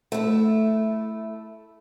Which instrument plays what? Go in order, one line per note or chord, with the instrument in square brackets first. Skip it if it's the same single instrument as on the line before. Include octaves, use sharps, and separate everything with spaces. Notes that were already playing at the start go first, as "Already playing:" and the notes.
[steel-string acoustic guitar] A3 E4